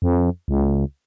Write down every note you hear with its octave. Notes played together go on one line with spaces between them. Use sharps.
F2
C#2